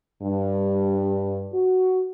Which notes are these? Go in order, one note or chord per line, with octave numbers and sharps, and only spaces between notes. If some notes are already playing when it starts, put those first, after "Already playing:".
G2
F#4